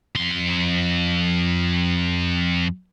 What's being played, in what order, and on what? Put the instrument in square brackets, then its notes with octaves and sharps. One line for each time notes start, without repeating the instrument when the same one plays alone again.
[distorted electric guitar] F2 C6